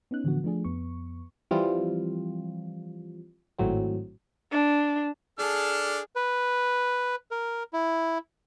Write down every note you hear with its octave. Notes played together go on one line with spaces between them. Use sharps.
B3 C#4 D#4 F#6
A2 D3 E3 F3 B3 F#4
F3 A3 D4 G#4
F2 B3 C#6
E3 F3 G3 C4 F4
G#1 A2 F#3 C4
D4
D4 G#4 A4 F6
B4
A#4
E4